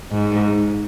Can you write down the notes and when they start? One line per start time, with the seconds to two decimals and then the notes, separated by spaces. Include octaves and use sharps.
0.11 G#2